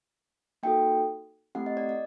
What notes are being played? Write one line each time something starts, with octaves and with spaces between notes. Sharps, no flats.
A#3 D#4 F#4 A4 G5
A3 C4 E4 G4 F#5
D#5
D5
D5